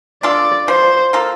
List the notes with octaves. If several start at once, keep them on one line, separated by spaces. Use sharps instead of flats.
D4 F4 A4 D5
F3 C5
A#3 F4 A4